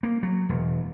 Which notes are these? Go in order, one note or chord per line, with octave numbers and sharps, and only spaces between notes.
A#3
F#3
E1